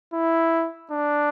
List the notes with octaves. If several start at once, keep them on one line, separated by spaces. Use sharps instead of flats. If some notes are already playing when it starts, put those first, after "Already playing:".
E4
D4